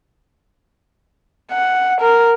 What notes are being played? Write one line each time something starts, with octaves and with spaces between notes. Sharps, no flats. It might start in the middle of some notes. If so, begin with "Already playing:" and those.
F#5
A#4